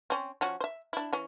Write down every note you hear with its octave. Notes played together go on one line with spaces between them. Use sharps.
C4 C#4
F3 C#4 F#4
C5 E5
D4 E4
E3 C#4